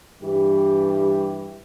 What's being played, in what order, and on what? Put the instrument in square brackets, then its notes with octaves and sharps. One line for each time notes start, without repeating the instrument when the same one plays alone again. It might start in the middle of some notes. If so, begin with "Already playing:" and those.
[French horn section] G2 E3 G4